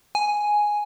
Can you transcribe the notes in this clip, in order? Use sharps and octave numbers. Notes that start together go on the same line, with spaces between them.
G#5